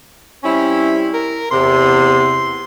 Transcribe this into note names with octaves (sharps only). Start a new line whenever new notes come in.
G3 C4 C#4 E4
A#4
E2 C3 C6